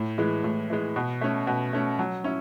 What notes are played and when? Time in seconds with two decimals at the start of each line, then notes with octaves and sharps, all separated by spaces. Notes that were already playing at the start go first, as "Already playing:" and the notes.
Already playing: A2
0.18 E3 G#3
0.44 A2
0.70 E3 G#3
0.96 B2
1.21 A3 C#4
1.47 B2
1.73 A3 C#4
1.99 F#3
2.24 C#4 E4